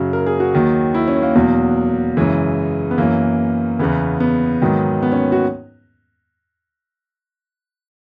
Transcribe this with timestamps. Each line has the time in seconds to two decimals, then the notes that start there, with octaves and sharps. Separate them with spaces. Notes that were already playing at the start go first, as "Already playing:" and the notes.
Already playing: F#2 C#3 F#3
0.13 A#4
0.26 G#4
0.40 F#4
0.54 D#2 D#3 F#3
0.94 E4
1.08 C#4
1.22 A#3
1.35 E2 B2 F#3
2.17 F#2 C#3 E3 G#3
2.91 B3
2.98 F#2 E3 A#3
3.79 E2 C#3 E3 B3
4.20 B3
4.62 G#2 D#3 F#3
5.02 B3
5.12 C#4
5.32 F#4